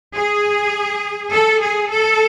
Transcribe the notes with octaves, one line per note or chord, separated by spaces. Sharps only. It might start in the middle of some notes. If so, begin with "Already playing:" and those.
G#4
A4
G#4
A4